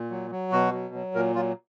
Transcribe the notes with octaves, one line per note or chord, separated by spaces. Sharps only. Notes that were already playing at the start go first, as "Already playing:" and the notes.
Already playing: A#2
F#3
F#3
B2 F#4
F#3
F#3
A#2 A#4
F#3 F4